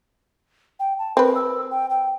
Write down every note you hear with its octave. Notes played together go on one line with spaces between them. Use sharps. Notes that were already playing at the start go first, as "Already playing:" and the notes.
G5
A5
C4 A#4 B4
E6
G5
G5